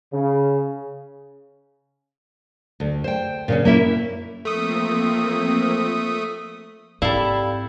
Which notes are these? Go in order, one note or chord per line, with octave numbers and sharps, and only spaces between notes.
C#3
D2
C5 G5
A#2 C#3 C#4
A#3 C#4 E4
F3 A3 A#3 C4 D#6
G#2 G3 C4 E4 A4 F5